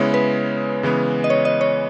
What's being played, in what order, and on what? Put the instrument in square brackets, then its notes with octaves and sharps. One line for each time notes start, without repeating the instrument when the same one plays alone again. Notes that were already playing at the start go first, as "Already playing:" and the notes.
Already playing: [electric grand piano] C#3 G#3 B3 E4 [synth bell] C#5
[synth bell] B4
[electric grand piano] C#3 E3 G#3 B3
[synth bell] D#5
C#5
D#5
C#5